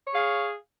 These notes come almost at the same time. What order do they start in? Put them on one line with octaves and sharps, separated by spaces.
C#5 G#4 F5